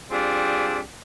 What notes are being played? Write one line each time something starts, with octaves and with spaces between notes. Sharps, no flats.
G3 C4 D4 F4 G#4